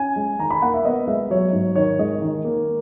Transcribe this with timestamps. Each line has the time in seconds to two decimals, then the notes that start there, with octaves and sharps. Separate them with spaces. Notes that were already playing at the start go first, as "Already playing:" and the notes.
Already playing: C#4 G#5
0.16 G#3
0.39 D#3 A#5
0.51 B5
0.62 A#3 F#5
0.74 E5
0.85 B3 D#5
1.07 G#3 E5
1.30 F#3 C#5
1.53 G#2
1.75 D#3 C#5
1.99 G#3 D#5
2.22 D#3
2.45 A#3